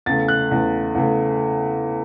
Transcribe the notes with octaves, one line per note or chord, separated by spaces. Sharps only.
E2 C#3 A3 A6
F#6
E2 C#3 A3
E2 C#3 A3